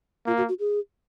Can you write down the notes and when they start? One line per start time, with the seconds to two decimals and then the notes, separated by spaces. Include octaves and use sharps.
0.26 A#3 F4
0.37 F#4
0.49 F#4
0.59 G#4